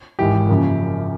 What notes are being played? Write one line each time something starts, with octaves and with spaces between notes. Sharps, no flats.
G#1 G#2 E3 G#3 G4
F#2 C#3 F3 A#3